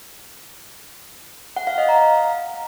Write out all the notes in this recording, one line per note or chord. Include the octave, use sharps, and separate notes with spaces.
F#5
F5
D#5
A#5
F5